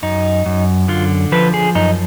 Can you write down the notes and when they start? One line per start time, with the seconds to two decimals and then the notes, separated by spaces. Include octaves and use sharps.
0.02 F#2 D#4
0.46 F#2
0.88 D3 F4
1.32 F3 B4
1.54 G#4
1.75 F#2 D#4